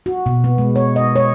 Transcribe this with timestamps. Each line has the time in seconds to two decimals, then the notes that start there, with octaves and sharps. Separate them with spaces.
0.06 F#4
0.26 B2
0.44 B3
0.58 G#3
0.76 C#5
0.96 D#5
1.16 C#5